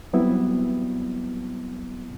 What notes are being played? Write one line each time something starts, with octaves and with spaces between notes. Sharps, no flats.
F#3 G3 B3 C4 E4